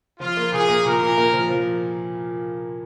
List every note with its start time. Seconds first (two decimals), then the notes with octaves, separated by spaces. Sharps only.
0.20 F3 F4
0.37 A#3
0.52 A#2 G#4
0.68 A#3
0.85 A#2 A#4
1.01 A#2
1.17 A#3
1.33 F3
1.49 F3